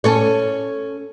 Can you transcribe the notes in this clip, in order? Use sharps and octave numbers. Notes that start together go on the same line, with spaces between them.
C#4 A4 C#5